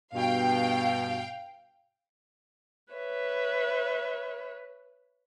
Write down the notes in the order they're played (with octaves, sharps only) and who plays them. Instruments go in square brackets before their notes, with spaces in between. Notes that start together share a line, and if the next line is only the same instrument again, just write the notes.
[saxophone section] G2 B2 [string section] F5 G5
[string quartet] B4 C#5 E5